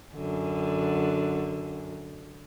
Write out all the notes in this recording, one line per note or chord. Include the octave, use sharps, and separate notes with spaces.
F#2 D3